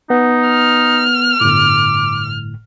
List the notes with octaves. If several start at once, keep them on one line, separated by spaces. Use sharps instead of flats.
B3 D#4
F6
G1 A2 D6